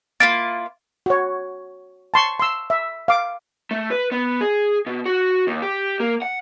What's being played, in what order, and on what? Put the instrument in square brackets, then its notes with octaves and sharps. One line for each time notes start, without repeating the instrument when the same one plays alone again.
[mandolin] A#3 E4 F4 [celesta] A6 D7
[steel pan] F#4 C#5
A5 C6 C#6
C6 E6
E5
F5 D6
[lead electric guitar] A3
B4
B3
G#4
B2
F#4
D#2
G4
A#3
F#5